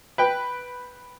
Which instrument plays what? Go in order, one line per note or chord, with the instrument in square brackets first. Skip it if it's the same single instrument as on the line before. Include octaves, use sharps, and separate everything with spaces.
[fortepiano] B4 G5